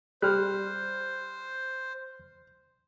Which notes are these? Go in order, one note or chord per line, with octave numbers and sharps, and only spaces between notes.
G3 C5 F6 F#6